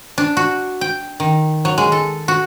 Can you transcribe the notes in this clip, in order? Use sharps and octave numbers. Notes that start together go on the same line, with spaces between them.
D4
F#4
G5
D#3
F#3
G#3
A4
F#4